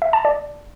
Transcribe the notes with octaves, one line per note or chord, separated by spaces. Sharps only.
E5
A5
D5